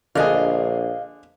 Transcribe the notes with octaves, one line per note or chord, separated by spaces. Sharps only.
A#1 D3 G#4 D#5 F5